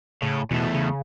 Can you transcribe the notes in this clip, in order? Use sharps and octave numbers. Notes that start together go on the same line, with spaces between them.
A2 C#3
E2 B2 A3
C#3